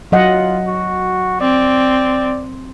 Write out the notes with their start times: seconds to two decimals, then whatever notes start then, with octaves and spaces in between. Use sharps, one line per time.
0.12 F#3 F4 D#5 F#5
0.67 F#4
1.41 C4 D5